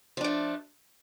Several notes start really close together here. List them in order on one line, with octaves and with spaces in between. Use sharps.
F3 D4 A3